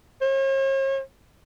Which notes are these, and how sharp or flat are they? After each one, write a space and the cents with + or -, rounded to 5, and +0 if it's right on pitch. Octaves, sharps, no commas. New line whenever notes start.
C#5 -45